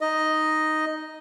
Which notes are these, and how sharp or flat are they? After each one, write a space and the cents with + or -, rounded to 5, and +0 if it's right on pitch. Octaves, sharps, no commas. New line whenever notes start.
D#4 +0 D#5 +0